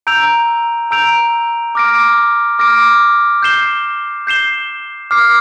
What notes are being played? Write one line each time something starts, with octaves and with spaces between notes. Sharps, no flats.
A#5 E6 G6 D7 F7
A#5 E6 G6 D7 F7
D6 F6 A#6 D7
D6 F6 A#6 D7
G6 C7 E7 G7
G6 C7 E7 G7
D6 F6 C7